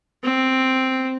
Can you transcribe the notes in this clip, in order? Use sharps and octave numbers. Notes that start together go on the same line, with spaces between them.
C4